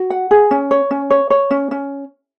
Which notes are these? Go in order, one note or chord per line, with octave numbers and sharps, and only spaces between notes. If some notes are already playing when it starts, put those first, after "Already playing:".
Already playing: F#4
F#5
G#4
C#4
C#5
C#4
C#5
C#5
C#4
C#4